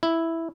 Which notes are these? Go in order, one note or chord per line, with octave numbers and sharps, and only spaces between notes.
E4